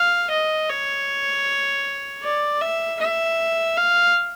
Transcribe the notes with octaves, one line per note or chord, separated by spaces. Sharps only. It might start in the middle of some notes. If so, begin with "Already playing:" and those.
Already playing: F5
D#5
C#5
D5
E5
E5
F5